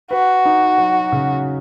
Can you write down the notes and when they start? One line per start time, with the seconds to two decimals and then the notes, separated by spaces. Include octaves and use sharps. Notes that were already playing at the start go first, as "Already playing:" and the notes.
0.11 F#4 B4
0.45 D#4
0.78 F#3
1.12 C#3